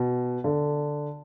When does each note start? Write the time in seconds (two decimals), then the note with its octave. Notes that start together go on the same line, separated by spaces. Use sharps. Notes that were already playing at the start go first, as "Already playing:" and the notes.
Already playing: B2
0.44 D3